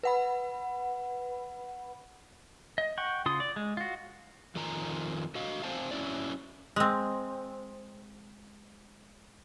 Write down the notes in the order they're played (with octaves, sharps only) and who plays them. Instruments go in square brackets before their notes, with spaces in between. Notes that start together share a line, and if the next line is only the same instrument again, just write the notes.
[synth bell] B4 F#5 B5
[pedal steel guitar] D#5
F#5 G5 C#6
C#3 F4 C6 D#6
D5
G#3
F4 F#4
[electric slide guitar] F2 D#3 F4 G#5 A#5
F#4 D#5 F5
C4 C5 F5 G#5 A5
F#3 C#4 E4 D5
[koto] G#3 C4